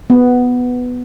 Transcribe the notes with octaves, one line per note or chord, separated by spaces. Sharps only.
B3